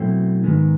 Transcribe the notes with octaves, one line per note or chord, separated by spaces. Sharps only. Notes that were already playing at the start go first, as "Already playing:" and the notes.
Already playing: B2 F#3 A3 C4 E4
G#2 D#3 G#3 B3